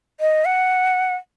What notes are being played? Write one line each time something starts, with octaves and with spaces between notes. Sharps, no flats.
D#5
F#5